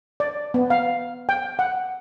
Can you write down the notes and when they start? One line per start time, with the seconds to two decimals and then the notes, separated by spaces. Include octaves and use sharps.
0.20 D5
0.54 B3
0.70 F5
1.29 G5
1.59 F#5